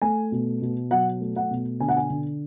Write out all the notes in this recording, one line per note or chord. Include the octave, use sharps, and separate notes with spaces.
A3 G#5
B2
B2
F#3 F#5
A3
F#5
B2
D3 G#5
F#5
G#5
D3